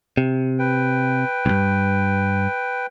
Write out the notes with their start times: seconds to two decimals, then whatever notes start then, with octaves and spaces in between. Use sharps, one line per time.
0.18 C3
0.59 B4 G5
1.46 C2 G2